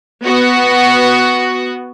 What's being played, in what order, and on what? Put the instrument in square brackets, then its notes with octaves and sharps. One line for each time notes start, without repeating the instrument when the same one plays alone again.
[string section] B3 F#4